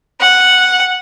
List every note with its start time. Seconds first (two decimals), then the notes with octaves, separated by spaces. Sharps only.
0.21 F#5